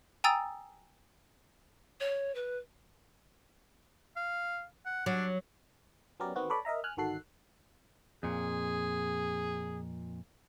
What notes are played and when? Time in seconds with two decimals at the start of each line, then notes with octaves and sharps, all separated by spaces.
0.24 G5 G#5 A#5 D#6 E6 A6
2.00 C#5
2.35 B4
4.16 F5
4.86 F#5
5.06 F#3 D4
6.20 F#3 B3 C#4 G4 A#4 D5
6.36 D#3 B3 C4 F#4
6.50 A4 B4 C#5 D5 B5
6.65 A#4 D#5 E5 A#5
6.84 G#5 F6 F#6
6.97 G1 D#3 F#4 A4 F#6 C7
8.23 F2 A#2 G#4